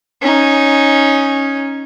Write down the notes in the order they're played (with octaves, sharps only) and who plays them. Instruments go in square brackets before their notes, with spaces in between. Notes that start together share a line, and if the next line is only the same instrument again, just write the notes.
[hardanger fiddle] C#4 D#4